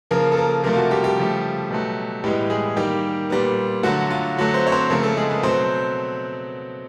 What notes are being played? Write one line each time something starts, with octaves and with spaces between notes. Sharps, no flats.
C#3 F3 A#3 A#4
A4
A#3 A#4
C3 F3 A3 A#3 A#4
F4
F#4
G3 G4
G3 G4
C#3 F3 A3
B2 F#3 A3
A2 E3 G3 G#3 B3 G4
G#3 G#4
D#3 G3 A#3 G4
A#2 G3 B3
D3 F#3 A3 F#4
F4
D3 F#3 A3
C4 C5
C#5
C4 C5
C#3 F3 A3 A#3 A#4
A3 A4
G#3 G#4
B3 B4
B2 F#3 A3 C4 C5